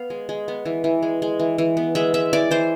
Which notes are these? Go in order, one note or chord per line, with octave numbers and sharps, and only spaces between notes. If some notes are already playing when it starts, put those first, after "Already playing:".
Already playing: B3 F5
G#3
G#3
B3
E3
E3
G#3
G#3
E3
E3
B3
G#3 E5
G#3 E5
E3 D5
E3 C5